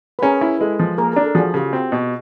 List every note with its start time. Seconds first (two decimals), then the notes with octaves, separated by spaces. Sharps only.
0.19 B4
0.22 C#4 G#4 A#4
0.41 E4
0.60 G#3 A4 B4
0.79 F3
0.98 A#3 G#4 A#4
1.13 D4 A#4
1.24 A4
1.35 F3 F#4 G#4
1.54 C#3 F4 G4
1.72 C4 F#4
1.92 B2